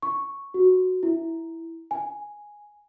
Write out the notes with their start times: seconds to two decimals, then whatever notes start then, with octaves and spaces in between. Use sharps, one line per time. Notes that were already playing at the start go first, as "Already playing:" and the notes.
0.02 C#6
0.54 F#4
1.03 E4
1.91 G#5